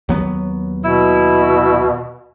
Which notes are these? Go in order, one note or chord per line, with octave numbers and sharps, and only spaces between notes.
D#2 F#3 B3
B2 E4 E6